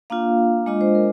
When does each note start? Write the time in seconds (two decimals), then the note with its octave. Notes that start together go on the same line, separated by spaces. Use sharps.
0.10 A#3 D4 F4 F5
0.66 G#3 D4 F4 D#5
0.81 C5
0.95 A#4